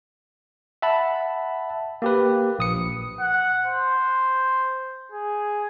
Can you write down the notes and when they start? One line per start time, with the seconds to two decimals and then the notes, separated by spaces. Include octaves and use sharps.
0.82 E5 F#5 A5 B5
2.02 A#3 G4 B4
2.59 A#1 D#6 C#7
3.20 F#5
3.65 C5
5.12 G#4